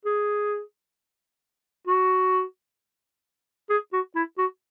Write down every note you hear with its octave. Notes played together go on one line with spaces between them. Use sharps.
G#4
F#4
G#4
F#4
E4
F#4